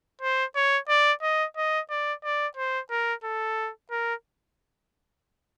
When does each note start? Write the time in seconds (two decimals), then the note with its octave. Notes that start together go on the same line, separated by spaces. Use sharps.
0.22 C5
0.55 C#5
0.89 D5
1.22 D#5
1.57 D#5
1.90 D5
2.24 D5
2.57 C5
2.91 A#4
3.24 A4
3.91 A#4